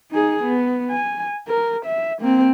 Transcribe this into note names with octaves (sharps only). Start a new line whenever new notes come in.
D#4 G#4
B3
G#5
A#4
E5
A#3 C4